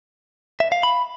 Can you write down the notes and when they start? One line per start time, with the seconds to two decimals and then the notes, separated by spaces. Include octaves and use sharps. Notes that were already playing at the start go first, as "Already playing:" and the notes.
0.60 E5
0.72 F5
0.83 B5